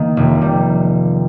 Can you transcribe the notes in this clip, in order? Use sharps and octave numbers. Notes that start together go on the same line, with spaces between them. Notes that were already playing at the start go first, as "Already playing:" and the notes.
Already playing: D#3 A#3
F1
G3